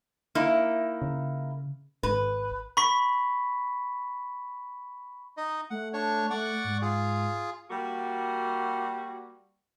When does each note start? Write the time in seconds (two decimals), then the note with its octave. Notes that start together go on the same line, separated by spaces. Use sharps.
0.35 A#3 D#4 E4
1.02 C#3
2.03 G#1 B4
2.77 B5 C#6 B6
5.37 D#4 D#5
5.70 A3 F#5
5.93 D4 C#5
6.30 A3 D5 F#5 C#6
6.64 G#2
6.82 F4 G#4
7.70 G3 A#3 F#4